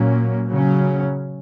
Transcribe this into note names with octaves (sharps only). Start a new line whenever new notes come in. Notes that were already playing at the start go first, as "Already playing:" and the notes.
Already playing: A#2 F#3 A#3 C#4
C#3 F#3 C#4